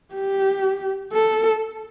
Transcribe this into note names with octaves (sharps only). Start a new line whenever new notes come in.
G4
A4